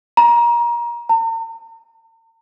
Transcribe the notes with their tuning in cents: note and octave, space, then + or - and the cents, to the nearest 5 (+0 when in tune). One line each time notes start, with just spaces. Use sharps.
A#5 +25
A#5 -45